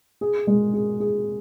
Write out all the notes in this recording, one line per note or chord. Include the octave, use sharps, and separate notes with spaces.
G#4
G#3
G#4
G#4